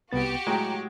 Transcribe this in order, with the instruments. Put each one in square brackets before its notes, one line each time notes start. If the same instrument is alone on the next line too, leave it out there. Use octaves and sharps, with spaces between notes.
[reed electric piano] C2 B3 A6 [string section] F#4 G4
[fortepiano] A2 F#3 G#3 [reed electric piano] G5 A#5